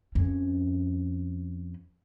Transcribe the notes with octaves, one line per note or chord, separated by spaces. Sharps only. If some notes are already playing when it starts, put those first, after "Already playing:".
F2 C#4